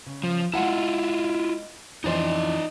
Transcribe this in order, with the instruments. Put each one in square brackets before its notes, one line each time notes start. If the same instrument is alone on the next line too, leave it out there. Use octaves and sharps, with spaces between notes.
[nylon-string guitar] C#3
[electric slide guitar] F3
[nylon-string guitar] G#3 F#5 A5 [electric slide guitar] E4 F4
[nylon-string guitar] F2 E3 C5 [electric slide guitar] D#4 D5 D#5